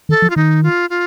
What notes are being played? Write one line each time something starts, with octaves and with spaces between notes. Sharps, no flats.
D#3 A4
F3
F4
D#3 D#4
F4
F4